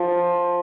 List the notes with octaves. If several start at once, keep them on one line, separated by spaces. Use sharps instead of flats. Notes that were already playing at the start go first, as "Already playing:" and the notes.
Already playing: F3